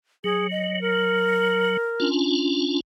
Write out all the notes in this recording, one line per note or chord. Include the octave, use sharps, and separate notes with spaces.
F#3 G#4
D#5
A#4
C#4 D4 F4